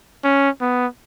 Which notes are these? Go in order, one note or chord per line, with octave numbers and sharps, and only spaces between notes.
C#4
B3